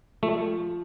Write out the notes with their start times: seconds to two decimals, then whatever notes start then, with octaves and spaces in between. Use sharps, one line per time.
0.23 F3 A3